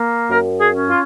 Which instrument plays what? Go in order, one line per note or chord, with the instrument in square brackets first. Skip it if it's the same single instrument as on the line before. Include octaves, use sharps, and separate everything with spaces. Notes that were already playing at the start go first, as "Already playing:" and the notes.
Already playing: [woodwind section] A#3
F#2 A#4
G#4
C#4
F4